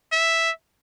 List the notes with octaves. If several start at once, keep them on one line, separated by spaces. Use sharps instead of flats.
E5